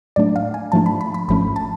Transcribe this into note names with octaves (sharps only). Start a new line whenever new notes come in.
A2 F#3 A3 D4 D5
F5
G#5
G#2 F3 A3 D4 A5
B5
B5
B5
G#1 G#2 F3 A3 C#4 B5
A5